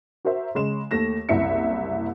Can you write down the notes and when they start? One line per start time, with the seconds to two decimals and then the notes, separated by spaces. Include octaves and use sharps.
0.25 F#4 A#4 C5 E5
0.55 C#3 G#3 E7
0.91 D#2 A3 A#6 E7
1.29 F#1 C2 E4 E5 C#7